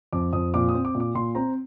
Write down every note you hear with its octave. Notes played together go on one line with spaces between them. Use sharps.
F2 D6
F2 D#6
A#2 D6
D#6
C4
D6
A#2
D6
A#2 C6
C4 A#5